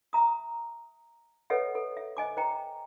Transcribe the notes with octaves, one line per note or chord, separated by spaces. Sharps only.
E5 A#5 D#6
A4 B4 C#5 D#5 E5 F#5
A4
E5
C5 D#5 G#5 D6
C5 D#5 G5 A#5